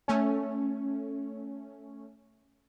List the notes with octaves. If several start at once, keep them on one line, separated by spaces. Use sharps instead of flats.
A3 C#4